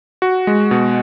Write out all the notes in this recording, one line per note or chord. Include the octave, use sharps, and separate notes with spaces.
F#4
G#3
B2